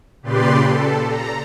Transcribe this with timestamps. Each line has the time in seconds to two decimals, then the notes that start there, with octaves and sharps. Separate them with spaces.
0.23 A#2 C#3 G4 B4 D5 C6
0.66 A4
1.07 A#5